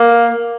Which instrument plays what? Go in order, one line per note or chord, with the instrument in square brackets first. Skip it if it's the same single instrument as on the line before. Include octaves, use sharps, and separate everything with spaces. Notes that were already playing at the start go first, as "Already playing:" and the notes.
Already playing: [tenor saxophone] A#3